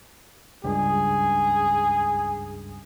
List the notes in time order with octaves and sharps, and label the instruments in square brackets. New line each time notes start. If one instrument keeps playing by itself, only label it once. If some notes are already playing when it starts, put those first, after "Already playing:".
[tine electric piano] C#2 G2 [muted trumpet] G#4